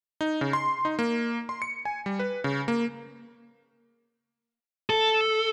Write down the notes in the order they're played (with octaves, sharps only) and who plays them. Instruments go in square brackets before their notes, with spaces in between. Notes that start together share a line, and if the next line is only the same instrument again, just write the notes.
[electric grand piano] D#4
C#3
C6
D#4
A#3
C6
C#7
G#5
G3
B4
C#3
A#3
[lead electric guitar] A4